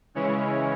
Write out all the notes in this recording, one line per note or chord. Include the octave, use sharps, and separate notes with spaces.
C#3 E3 G#3 C#4 E4 C#5